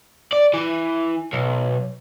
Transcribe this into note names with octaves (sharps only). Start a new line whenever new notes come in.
D5
E3
B1